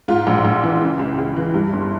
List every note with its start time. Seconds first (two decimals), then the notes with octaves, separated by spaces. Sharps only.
0.08 G#2 F4
0.27 A#1
0.44 A#1
0.63 E3
0.82 C#3
0.99 C#2
1.18 C#2
1.36 E3
1.54 G2
1.73 G1